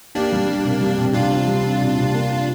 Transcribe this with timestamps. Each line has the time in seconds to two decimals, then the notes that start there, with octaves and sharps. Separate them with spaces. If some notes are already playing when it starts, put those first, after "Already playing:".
0.15 A#3 D4 G4
0.32 G3
0.48 G3
0.65 C3
0.81 G3
0.98 C3
1.14 C3 D4 F4
1.31 C4
1.48 G3
1.64 C4
1.81 C3
1.97 C3
2.15 A#3